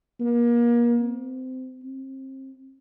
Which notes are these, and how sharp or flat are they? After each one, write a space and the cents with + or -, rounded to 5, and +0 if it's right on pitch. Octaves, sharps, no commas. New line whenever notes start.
A#3 +30
C4 -25
C4 +30